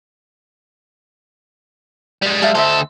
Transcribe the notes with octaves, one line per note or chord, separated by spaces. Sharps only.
G3 G#3
A4 E5 F5
D2 A4 C5 D#5 E5